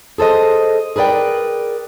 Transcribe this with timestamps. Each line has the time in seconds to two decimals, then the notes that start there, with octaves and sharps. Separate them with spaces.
0.18 G#4 A4 C5 D#5
0.96 G#4 A#4 B4 D5 G5